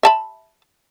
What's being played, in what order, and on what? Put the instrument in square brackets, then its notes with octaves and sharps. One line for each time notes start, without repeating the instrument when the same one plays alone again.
[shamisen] E5 A5 B5